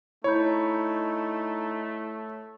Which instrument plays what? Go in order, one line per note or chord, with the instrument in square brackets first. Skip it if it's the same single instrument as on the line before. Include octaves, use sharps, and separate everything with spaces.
[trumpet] A3 [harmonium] D#4 [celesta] E4 B5 G6 [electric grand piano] C#5